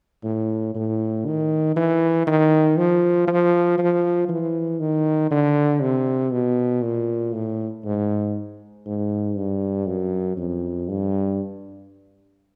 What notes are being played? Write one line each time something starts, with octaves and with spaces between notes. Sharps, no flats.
A2
A2
D#3
E3
D#3
F3
F3
F3
E3
D#3
D3
C3
B2
A#2
A2
G#2
G#2
G2
F#2
F2
G2